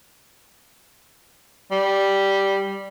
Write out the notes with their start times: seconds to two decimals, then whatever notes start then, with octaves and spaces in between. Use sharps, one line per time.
1.72 G3